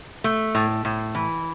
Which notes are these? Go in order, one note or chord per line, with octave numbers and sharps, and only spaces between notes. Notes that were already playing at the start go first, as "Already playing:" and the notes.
A3
A2
A2
E3